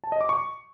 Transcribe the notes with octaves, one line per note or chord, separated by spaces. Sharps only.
A5
D#5
D6
C#6